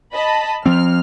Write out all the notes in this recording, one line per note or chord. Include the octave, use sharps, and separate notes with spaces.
D#5 A5 B5
F3 C4 F6